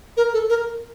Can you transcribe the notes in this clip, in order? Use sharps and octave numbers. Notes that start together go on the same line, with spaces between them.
A#4
A4
A#4